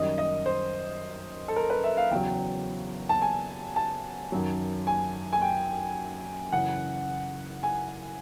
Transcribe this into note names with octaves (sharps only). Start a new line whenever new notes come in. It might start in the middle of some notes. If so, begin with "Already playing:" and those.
Already playing: F#2 D#3 G3 D#5
D#5
C5
A4
A#4
B4
E5
F5
E2 C#3 F#3 G5
A5
G#5
A5
F#2 D#3 F#3
G#5
G#5
G5
F#2 C#3 E3 F#5
G#5